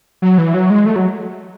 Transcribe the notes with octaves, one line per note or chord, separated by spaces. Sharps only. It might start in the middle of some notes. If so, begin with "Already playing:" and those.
F#3
E3
F#3
G#3
A3
F#3